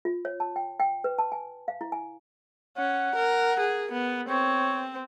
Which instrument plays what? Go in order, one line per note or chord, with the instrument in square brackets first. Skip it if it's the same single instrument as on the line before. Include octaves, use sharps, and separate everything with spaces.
[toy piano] F4
C#5
A5
G5
G5
B4
A5
G#5
F5
E4
G#5
[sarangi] C#4 [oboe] F#5
[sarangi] A#4
G#4
B3
[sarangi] C4 [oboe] C#5